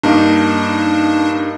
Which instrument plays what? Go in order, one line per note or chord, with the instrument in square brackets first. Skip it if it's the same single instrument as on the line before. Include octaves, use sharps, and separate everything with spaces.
[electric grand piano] G2 A#3 D#4 [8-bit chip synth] D4